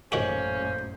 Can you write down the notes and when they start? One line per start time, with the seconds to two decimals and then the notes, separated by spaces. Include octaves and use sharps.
0.12 A1 F#2 D#3 A#3 C#4 F#4 G4 C5